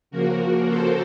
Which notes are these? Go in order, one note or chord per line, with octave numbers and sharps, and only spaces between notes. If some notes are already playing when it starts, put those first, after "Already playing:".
C#3 F3 A#3 F#4 A#4
A4 C5